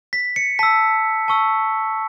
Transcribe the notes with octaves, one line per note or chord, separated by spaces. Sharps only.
B6
C#7
A5 E6 B6
A5 C#6 E6